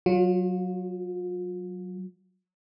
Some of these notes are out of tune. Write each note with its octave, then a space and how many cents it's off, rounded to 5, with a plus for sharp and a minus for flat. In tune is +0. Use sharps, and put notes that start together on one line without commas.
F#3 +0 F4 +40